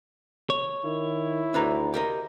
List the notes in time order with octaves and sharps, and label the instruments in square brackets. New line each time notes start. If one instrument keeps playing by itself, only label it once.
[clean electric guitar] C#5
[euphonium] D#3 [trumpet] E4
[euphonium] D2 [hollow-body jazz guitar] D4 B4 A#5
[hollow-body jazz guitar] G4 A#4 D#5